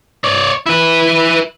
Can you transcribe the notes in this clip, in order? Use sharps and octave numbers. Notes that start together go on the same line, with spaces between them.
C#5 D5
E4 B4